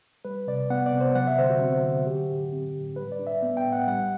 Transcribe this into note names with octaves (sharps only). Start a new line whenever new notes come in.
G3 B4
C3 D5
B3 F#5
D5
C3
C5
F#3 F#5
E5
D3 C5
F#4
C4
D3
F#3 G4
A2
C4
A2
G3 B4
D5
D4
E5
B3
G5
A2
F#5
G3 F#5